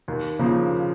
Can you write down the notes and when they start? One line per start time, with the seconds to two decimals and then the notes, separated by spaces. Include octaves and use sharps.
0.08 D#2
0.39 C#3 F3 A#3